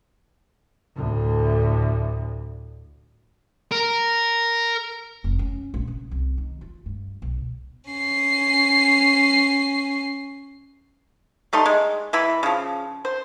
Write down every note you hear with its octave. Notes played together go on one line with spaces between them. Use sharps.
D2 A2
A#4
F1
C#4
A#1
C#3
C2
D#3
F4
G2
B1
C#4 C7
G3 A3 D#4 C6
G#3
E3 E4 B5
C#3 F3
C5